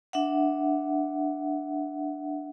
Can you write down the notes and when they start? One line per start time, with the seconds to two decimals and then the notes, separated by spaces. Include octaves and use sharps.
0.13 D4 E5 F#5